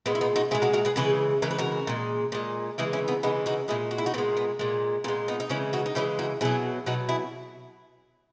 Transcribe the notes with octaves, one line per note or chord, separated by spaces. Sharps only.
A#2 G#3 B3
E4
B3 D#4
D#4 F#4
A#2 G#3 E4 G#4
F#4 A#4
F#4 A#4
G#4 B4
C#3 E3 G#3 G#4 B4
C#3 E3 G#3 A#4
B4
F#4 A#4
A#2 G#3
A#2 G#3
C#3 E3 G#3 E4 G#4
C#4 E4
B3 D#4
C#3 E3 G#3 B3 D#4
D#4 F#4
A#2 G#3 E4 G#4
F#4
E4
D#4 F#4
A#2 G#3 B3
B3
A#2 G#3 A#3
A#2 G#3 B3
B3 D#4
D#4
C#3 E3 G#3 C#4 E4
D#4 F#4
D#4
C#3 E3 G#3 C#4 E4
D#4 F#4
B2 F#3 E4 G#4
B2 F#3 D#4 F#4
E4 G#4